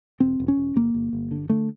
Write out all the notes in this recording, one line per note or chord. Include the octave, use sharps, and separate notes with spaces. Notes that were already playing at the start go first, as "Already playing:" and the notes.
E1 C4
E1
C#4
E1
G1 A#3
G1
G1
D3
D3 A3